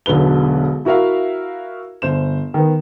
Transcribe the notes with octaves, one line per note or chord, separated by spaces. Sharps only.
E1 B1 D3 B4 G7
E4 F#4 A#4 E5 F5
G1 C5 E7
D#3 B3